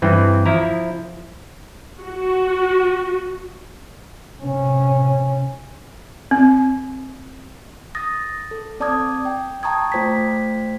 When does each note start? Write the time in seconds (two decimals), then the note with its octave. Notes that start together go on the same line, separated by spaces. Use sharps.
0.02 G2 E3 C4
0.46 F3 E4 A#5
2.01 F#4
4.42 C3 C#4
6.31 C4
7.95 D#6 A6 A#6
8.51 A4
8.80 C4 D5 A5 D6 D#6 G#6
9.25 G5
9.63 G5 A5 A#5 C#6 D#6 G#6
9.92 A3 F4 C5 G5 G#6 B6